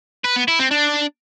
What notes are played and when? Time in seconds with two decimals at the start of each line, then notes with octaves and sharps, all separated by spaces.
0.25 B4
0.36 B3
0.48 E4
0.59 C4
0.71 D4